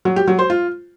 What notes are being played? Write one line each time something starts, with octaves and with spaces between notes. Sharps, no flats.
F#3
G4
F#3
C5
F4